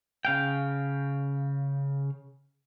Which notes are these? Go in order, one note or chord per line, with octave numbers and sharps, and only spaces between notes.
C#3 F5 G5